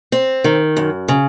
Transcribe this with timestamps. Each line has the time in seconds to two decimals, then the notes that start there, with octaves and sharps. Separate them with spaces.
0.12 C4
0.44 D#3
0.77 F#2
1.08 C#3